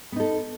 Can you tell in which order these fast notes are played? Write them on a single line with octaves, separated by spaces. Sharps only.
B3 D#4 A4